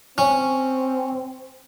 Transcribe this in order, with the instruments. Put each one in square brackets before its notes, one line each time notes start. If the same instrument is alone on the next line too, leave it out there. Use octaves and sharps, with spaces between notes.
[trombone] C4 [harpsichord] C#4